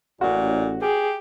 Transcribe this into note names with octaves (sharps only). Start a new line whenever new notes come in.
A1 A#2 F#4
G4 G#4